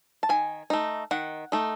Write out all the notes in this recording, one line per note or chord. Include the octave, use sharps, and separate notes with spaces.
A5
D#3 G#5
A3 D#4
D#3 F#5
A3 D#4